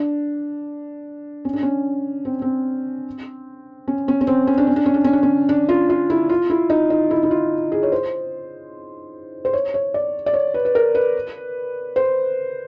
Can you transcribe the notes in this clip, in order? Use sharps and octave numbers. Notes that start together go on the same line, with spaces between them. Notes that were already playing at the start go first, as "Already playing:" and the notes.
Already playing: D4
C#4
D4
C#4
C4
C4
C#4
C#4
C#4
C4
C#4
D4
C#4
D4
C#4
D4
C#4
D4
C#4
D4
F4
F4
E4
F4
E4
D#4
D#4
E4
E4
F4
G#4
C#5
C5
C5
C#5
C#5
D5
D5
C#5
B4
B4
A#4
B4
C5